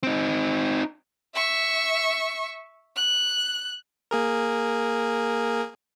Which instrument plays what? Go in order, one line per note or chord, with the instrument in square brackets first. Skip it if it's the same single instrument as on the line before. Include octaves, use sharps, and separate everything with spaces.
[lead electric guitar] C4 D#4
[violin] E5 C#6
F#6
[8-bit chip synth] A#3 G#4 A#4